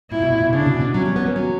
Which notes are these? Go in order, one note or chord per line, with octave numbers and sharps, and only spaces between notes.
A#2 E4
B2
A#2
B2
C#3 D4
B2
B2
F#3 C#4
G3
B3
A#3
F#3